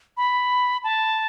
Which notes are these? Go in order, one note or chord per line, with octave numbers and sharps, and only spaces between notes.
B5
A5